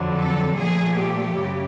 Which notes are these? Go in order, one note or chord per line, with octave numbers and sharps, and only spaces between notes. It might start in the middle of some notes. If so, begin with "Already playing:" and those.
Already playing: F2 D3 F#3
A4
A#2 F3 A3 G#4
G4
F#2 C#3